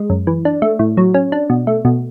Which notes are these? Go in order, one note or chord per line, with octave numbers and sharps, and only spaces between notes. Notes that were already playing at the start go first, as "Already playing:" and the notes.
Already playing: G#3
F#2
E3
D4
A3
A2
F#3
C#4
D4
B2
A3
B2